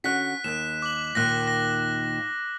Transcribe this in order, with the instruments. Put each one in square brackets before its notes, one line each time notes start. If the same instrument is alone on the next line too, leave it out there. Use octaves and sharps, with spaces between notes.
[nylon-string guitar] D3 C#4 F#4 [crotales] F#6 B6
[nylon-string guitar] D#2 [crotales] F#6 E7
[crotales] D6 F#7
[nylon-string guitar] D#2 A#2 D#3 [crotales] F#6 A#6
[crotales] A#6